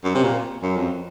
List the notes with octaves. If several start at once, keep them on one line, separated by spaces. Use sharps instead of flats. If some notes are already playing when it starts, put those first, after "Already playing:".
F#2
C3
A#2
F#2
F2